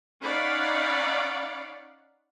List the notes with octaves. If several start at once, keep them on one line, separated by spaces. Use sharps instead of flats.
C#4 D#4 D5 F5 F#5 B5